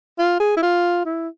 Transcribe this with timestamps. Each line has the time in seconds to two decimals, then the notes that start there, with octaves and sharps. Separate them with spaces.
0.19 F4
0.40 G#4
0.57 E4
0.62 F4
1.06 E4